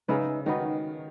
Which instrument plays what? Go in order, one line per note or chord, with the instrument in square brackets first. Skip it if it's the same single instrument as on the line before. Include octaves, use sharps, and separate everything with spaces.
[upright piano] C#3 [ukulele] D#4 G#4 B4 E5
[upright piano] D#3 [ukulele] D#4 F#4 B4 D#5